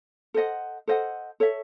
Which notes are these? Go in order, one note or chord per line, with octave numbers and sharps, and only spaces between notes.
A4 C5 D#5 F#5
A4 C5 D#5 F#5
A4 C#5 E5